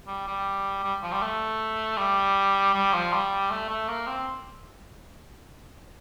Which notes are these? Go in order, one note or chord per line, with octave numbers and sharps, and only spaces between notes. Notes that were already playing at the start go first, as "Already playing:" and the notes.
G3
G3
G3
F3
G3
A3
G3
G3
F3
G3
A3
A3
A#3
C4